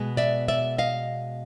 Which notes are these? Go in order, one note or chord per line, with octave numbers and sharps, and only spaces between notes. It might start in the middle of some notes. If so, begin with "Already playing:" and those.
Already playing: B2 G#3 B3
D5 E5
D5 E5
D#5 F5